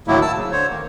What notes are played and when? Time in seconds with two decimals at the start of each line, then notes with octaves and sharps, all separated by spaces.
0.07 D2 A2 D#3 F#3 A#3 E4
0.22 A5 E6
0.36 C#3
0.52 D3 C5 C#5
0.69 D#3 A#3